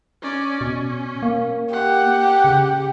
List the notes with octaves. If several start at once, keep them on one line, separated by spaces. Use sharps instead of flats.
C#4 D5
B2 C#4
A#3
G4 F#5
C#3